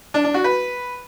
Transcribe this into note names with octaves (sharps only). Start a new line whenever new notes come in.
D4
D4
F#4
B4